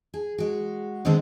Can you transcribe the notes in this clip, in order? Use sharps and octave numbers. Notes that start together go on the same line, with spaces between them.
G#4
G#3 F#4
D3 D#3 G#3 B3 C4